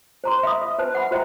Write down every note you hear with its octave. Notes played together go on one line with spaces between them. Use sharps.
C5 A#5 C6
E5 F5 B5 D#6
E5
B4 C5 A5
F#5 B5
F#4 C5 E5 G5 A#5